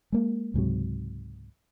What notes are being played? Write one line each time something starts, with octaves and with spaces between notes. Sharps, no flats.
G#3 A#3
C#2 G#2 C3 F#3